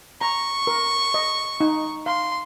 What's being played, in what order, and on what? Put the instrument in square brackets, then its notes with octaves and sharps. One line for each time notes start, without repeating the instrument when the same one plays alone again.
[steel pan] A#5 [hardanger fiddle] C#6
[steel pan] A#4
D#5
D#4
[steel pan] F5 [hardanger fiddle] C6